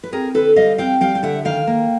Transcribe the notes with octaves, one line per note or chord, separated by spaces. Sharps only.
B4
C4 G#4 A#4
D3 A4 B4
G3 D#5 F5
C4 F5 G5
G3 F5 G5
G5
D3 E5 F#5
D#3 F5 G5
A#3